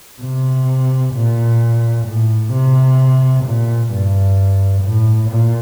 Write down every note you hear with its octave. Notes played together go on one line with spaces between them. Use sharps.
C3
A#2
A2
C3
A#2
G2
A2
A#2